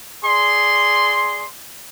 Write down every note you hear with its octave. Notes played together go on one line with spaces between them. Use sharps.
G#4 D5 C6